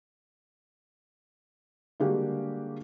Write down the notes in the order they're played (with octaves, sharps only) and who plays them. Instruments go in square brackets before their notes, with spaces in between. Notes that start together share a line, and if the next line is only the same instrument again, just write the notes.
[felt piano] D3 G3 G#3 A#3 F#4 G4